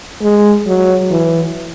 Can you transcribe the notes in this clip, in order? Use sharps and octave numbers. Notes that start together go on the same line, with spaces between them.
G#3
F#3
E3